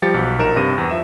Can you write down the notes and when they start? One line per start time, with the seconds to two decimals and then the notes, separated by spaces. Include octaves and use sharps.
0.02 F3 G3 G4 A6 C#7
0.14 B1 F#4
0.38 A#1 D#4 A#4 D7 E7
0.56 G2 C3 A#6 D#7
0.78 E2
0.90 F3 E5 E7